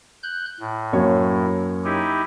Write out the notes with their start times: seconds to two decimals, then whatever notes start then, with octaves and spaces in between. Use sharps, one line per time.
0.23 F#6 G6
0.60 A2
0.93 F#2 A#3 C#5
1.84 D#4 E4 G4